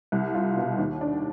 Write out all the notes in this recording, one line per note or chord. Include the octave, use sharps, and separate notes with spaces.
C2
F4
B2
D#2
D4